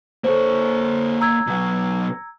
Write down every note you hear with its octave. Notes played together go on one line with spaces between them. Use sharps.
A#3 A4 C5 C#5
A#5 E6 G#6
B2 F#3